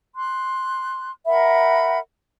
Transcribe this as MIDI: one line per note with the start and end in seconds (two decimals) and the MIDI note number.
0.16 1.11 84
0.16 1.11 90
1.27 1.99 70
1.27 1.99 76
1.27 1.99 78
1.27 1.99 83